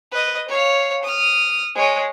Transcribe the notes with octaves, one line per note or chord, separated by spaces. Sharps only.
B4 D#5
C#5 F5
D#6 F6
G#3 C#5